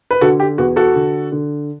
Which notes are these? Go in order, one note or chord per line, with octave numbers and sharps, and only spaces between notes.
B4
D3 F#4 A4
G4
E2 F#4
F#4 A4
D3
D3